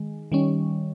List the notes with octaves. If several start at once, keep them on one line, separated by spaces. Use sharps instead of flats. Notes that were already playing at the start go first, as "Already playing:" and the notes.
Already playing: D#3 G#3
D#3 G3 C#4